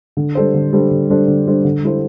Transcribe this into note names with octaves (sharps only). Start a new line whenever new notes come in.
D3
G3 D4 A4 C5
D3
G3 D4 A4 C5
D3
G3 D4 A4 C5
D3
G3 D4 A4 C5
D3
G3 E4 A4 C5